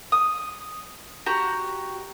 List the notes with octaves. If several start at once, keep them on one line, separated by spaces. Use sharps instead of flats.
D#6
F#4 G4 A#5